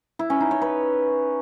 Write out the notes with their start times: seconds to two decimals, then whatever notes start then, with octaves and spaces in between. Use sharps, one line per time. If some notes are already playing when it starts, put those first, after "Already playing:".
0.19 E4
0.30 C#4
0.40 D#4
0.51 C#5
0.61 B4